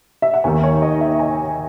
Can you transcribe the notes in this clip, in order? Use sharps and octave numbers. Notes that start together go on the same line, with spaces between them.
E5
F#5
D#2 D#3 G#5
C#5
D#5
E5
G#5